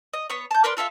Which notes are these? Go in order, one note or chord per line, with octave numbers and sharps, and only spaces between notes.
D#5
B3 C#5
A5 G6
A#4 B4 D5 C6
F4 A4 E5 F5